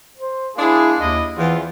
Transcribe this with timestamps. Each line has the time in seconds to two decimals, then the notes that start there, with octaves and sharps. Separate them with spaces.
0.17 C5
0.57 G#3 A#3 D4 E4 G#4
1.00 D#2 E4 D#5
1.38 E2 E3 C4 F4